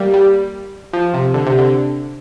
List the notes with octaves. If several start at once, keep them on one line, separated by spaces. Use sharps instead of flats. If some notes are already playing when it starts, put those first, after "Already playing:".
Already playing: G3 A#3
G3
F3
C3
D3
C3
D3